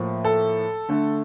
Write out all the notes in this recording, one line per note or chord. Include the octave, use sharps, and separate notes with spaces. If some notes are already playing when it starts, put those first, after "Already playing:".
Already playing: A2 F3 A#3
A4
D3 A3